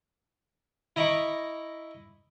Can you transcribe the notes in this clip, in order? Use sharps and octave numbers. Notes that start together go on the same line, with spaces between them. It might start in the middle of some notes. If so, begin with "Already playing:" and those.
E4 D#5 A#5 B5 C#6 D6